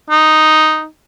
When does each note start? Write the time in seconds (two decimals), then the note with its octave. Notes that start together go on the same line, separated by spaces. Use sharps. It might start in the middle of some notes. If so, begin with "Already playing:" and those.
0.10 D#4